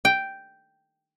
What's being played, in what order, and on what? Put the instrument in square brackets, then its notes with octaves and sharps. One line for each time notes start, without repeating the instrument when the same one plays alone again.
[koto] G5